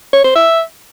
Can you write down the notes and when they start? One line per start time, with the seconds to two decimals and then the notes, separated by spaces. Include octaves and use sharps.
0.13 C#5
0.24 C5
0.35 E5